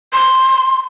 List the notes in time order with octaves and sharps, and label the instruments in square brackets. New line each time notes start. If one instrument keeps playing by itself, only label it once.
[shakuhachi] C6